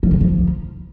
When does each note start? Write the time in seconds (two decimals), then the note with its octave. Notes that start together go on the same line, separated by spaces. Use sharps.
0.03 F3
0.11 D3
0.21 F3